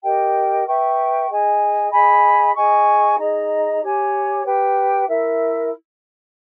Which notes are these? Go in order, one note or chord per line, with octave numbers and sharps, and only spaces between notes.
G4 A#4 D#5 G5
B4 E5 G5 C#6
G#4 D#5 G#5
G#4 D#5 G#5 B5
G#4 D#5 G#5 C#6
D#4 G#4 D#5 A#5
G4 C#5 G#5
G4 B4 G5
E4 A#4 E5